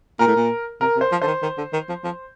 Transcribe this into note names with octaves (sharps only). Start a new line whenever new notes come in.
A#2 A#4
A2
A#2
C3 A#4
C3
C5
F3
D3 C5
D#3
D#3
D3
D#3
F3
F3